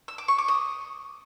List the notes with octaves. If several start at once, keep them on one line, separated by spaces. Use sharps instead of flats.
E6
D6
C#6
D6
D#6